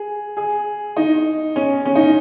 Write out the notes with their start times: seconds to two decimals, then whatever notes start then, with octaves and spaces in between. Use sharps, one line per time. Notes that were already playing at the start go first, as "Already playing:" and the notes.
Already playing: G#4
0.37 G#4
0.96 D#4
1.56 C#4
1.85 C#4
1.95 D#4